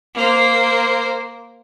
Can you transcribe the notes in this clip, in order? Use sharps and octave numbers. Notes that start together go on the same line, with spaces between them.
A#3 C5